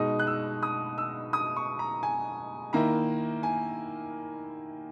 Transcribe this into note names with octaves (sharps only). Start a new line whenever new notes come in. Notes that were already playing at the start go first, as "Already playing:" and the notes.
Already playing: B2 G#3 D#4 D#6
F#6
E6
D#6
E6
D#6
C#6
A#5
G#5
D#3 A#3 E4 A#5
G#5